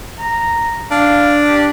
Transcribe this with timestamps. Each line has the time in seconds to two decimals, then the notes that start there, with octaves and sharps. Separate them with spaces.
0.19 A#5
0.91 D4 F5
1.48 G4